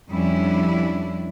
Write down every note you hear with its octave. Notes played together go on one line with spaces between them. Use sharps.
F2 G3 C#4 D4 E4